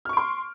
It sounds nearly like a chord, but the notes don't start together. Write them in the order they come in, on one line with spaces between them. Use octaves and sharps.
F6 C#6 D7 C6